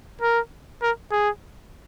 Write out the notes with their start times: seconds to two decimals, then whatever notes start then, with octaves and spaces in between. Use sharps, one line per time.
0.21 A#4
0.82 A#4
1.11 G#4